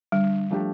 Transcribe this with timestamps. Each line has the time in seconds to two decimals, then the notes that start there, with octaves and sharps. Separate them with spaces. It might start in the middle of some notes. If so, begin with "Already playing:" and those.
0.12 D3 G3
0.51 F3 A3 D4 G4